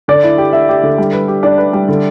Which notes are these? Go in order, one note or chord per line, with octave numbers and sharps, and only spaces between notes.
D3 D5
E4
G4
E4 E5
G4
D3
G3
B4
G4
D4 D5
B4
G3
D3